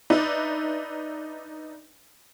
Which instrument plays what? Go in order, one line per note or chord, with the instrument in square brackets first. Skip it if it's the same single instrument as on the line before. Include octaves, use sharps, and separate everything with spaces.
[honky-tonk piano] D4 D#4 B4 D5 E5